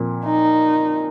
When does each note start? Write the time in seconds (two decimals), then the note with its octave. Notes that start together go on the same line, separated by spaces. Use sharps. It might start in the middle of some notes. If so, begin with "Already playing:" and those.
Already playing: A#2 F3 C4
0.25 D#4